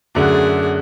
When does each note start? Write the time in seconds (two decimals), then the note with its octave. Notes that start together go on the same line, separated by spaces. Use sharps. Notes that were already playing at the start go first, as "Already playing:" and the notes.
0.15 F#2 D3 A3 D4 F#4 G#4